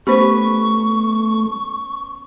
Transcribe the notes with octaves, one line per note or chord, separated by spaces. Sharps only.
A3 B3 C#4 G4 B4 C5 C#6